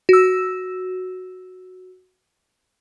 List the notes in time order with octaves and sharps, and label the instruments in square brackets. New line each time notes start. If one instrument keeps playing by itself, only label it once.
[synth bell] F#4 E6